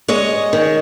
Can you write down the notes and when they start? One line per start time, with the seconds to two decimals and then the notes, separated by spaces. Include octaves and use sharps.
0.08 G#3 C#5 D#5
0.53 D#3